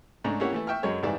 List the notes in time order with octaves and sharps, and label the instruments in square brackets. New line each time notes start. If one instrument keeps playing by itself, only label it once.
[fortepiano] G#2 A3 C#4 D4 A#5
A#3 C#4 E4 G4 C#5 F#5
E3 A3 E4
E5 G5 C#6 F6
F#2 F#3 G#3 C#5
G#1 G#2 E3 G3 D5 E5